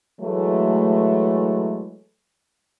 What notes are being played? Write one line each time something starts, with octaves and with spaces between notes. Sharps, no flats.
E3 F#3 G#3 A3